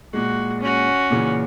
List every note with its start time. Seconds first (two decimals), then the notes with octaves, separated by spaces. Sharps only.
0.13 A#2 G#3 F#4
0.61 C#4 F#4
1.10 A#2 C#3 E3